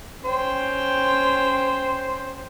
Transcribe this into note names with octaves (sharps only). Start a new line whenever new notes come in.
C#4 C5 G5